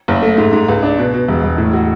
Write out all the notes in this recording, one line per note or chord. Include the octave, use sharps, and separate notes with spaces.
F#1
A3
G#2
G#2
C#2
D4
B2
B2
E1
E1
A2
F#4